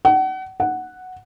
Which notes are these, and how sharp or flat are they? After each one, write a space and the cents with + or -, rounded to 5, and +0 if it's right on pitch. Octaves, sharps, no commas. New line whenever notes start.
F#5 +35
F#5 +0